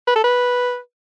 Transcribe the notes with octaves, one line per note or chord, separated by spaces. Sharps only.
B4
A4
B4